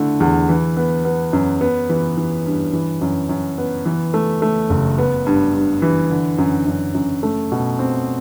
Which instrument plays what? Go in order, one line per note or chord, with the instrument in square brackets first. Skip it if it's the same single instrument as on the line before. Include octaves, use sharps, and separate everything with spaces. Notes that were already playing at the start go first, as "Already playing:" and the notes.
Already playing: [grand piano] D3 A3 E4
E2
E3
B3
B3
F#2
B3
E3
E3
G2
E3
F#2
F#2
B3
E3
A3
A3
F#1
B3
G2
G2
E3
D3
F#2
F#2
F#2
A3
B2
C4